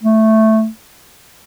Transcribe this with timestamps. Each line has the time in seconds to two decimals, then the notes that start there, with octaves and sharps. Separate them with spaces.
0.03 A3